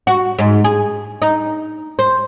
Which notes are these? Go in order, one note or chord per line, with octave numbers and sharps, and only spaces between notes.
F#4
G#2
G#4
D#4
C5